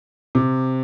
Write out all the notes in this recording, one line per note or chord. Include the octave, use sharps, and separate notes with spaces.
C3